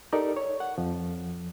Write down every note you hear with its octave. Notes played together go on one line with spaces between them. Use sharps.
D#4 G4 A4 A#4 D5
C#5
F#5
F2 F3